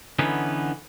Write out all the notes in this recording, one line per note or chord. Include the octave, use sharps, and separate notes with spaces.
D3 E3 B3 C#4 D#4